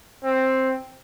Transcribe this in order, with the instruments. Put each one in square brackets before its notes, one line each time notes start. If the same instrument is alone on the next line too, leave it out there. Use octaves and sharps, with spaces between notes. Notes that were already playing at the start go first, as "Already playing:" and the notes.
[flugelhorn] C4